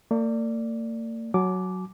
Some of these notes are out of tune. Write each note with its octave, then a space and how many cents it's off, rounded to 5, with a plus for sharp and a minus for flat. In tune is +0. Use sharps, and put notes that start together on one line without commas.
A#3 -45 D5 +0
F#3 +0 G#5 +45 D6 -5